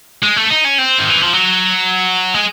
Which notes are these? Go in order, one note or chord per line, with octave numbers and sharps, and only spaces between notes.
G#3
A3
D#4
C#4
C4
D#3
E3
F3
F#3
G#3